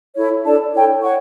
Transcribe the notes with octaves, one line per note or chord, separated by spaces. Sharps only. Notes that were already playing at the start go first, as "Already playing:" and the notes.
E4 A4 C#5
D4 A4 D5 A5
E4 A4 C#5 G5
C#5 F#5 C#6